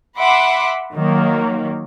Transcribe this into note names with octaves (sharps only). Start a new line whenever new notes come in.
E5 F#5 B5 C6 D6
D#3 F#3 A#3